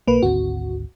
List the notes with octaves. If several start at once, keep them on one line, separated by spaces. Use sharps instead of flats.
B1 A#3 B4
G#1 D2 C4 F#4